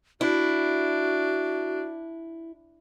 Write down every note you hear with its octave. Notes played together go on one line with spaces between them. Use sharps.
D4 E4 F#4